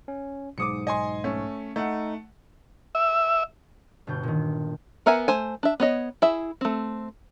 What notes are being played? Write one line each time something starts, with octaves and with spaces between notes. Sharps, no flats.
C#4
B1 G#2 D6 D#6 C#7
D#5 G#5 C6
A3 C#4
A3 D#4 F#5
E5
G1 B2 G6
A#2 D#3
B3 A#4 E5 F#5 G#5
A3 C5 G#5
D4 E5
B3 C#5 D#5
E4 G#4 E5
A3 C4